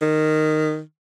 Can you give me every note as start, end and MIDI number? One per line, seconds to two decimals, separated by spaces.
0.01 0.80 51